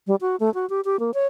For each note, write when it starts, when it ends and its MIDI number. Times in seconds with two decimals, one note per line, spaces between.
0.07 0.15 55
0.21 0.36 66
0.40 0.53 57
0.54 0.68 66
0.70 0.81 67
0.85 0.99 67
1.00 1.11 58
1.14 1.27 73